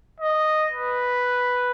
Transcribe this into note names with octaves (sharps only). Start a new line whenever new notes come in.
D#5
B4